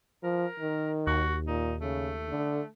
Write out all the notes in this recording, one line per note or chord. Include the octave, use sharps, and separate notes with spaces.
F3 A#4
D#3
D#2 F#4
A#2 D#4
C#3 A3
D3